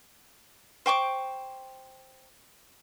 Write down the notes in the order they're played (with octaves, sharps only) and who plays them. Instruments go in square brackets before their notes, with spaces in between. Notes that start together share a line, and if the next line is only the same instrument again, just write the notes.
[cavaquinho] C5 G5 C#6 D6